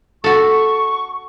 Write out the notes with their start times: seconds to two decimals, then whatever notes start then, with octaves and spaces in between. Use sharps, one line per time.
0.24 F#4 A4 C#6